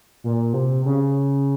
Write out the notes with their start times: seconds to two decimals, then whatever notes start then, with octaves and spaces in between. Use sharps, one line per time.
0.24 A#2
0.53 C3
0.85 C#3